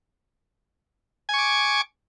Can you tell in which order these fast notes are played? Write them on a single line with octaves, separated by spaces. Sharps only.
G#5 C#6 D6